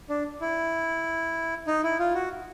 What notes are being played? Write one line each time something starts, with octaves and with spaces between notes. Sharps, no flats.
D4
E4
D#4
E4
F4
F#4